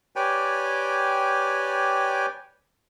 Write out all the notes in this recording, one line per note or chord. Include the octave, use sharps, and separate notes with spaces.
G4 B4 C#5 D5 G5 G#5